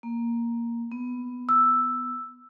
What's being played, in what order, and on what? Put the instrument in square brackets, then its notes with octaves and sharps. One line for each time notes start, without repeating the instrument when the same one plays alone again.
[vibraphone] A#3
B3
[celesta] E6